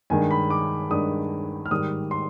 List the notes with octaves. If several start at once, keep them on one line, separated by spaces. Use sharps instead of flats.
G2 D#3 G#3 D4 G#5
B5
D6
G2 D#3 G#3 D4 D#6
F6
G#2 D#3 G3 D#6
C6